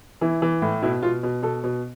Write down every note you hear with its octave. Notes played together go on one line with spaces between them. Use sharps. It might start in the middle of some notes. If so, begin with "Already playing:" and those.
E3 E4
E3
A2
B2 E4
B2 F4
B2
B2 A4
B2